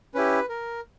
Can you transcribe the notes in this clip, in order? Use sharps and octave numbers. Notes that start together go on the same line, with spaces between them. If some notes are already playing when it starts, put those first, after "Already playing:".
C#4 E4 G4 B4
A#4